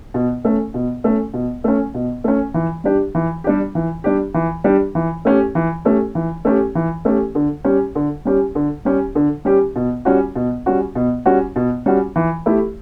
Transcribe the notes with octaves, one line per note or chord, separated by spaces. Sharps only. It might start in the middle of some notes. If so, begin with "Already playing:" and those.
B2
A3 C#4
B2
A3 C#4
B2
A3 C#4
B2
A3 C#4
E3
G3 D4 G4
E3
G3 D4 G4
E3
G3 D4 G4
E3
G3 D4 G4
E3
A3 C#4 G4
E3
A3 C#4 G4
E3
A3 C#4 G4
E3
A3 C#4 G4
D3
G3 C#4 G4
D3
G3 C#4 G4
D3
G3 C#4 G4
D3
G3 C#4 G4
B2
G3 C#4 F#4
B2
G3 C#4 F#4
B2
G3 C#4 F#4
B2
G3 C#4 F#4
E3
A3 E4 G4